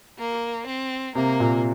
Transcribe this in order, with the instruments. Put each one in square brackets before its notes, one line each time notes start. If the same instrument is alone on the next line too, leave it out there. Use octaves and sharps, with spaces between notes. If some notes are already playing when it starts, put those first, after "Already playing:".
[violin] A#3
C4
[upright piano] C3 [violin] A#3
[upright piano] A#2